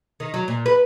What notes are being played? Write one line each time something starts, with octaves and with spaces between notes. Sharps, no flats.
D#3
F#3
A#2
B4